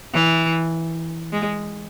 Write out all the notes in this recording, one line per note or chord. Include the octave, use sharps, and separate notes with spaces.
E3
G#3